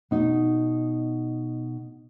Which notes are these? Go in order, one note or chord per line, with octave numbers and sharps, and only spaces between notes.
B2 D#4